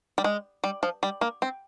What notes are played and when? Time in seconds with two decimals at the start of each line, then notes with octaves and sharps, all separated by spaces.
0.18 G3
0.24 G#3
0.64 G3
0.83 F3
1.03 G3
1.21 A#3
1.42 C4